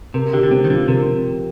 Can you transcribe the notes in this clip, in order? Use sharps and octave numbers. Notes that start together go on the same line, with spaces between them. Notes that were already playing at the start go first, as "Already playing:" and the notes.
C3 A#4
D3 G4
D3
C3 C4
D#3
D3 F3
C3 A#4